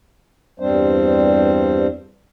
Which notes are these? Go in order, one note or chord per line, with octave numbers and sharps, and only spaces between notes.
E2 G2 G3 C4 D4 C5